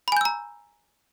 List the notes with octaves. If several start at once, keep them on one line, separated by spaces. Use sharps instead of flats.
G#5 A#5 B5 E6 G6